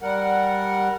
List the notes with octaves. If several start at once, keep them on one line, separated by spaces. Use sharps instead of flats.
G3 A#4 F#5